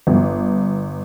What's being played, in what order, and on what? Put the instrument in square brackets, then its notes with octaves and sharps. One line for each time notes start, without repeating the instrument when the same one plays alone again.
[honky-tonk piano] G1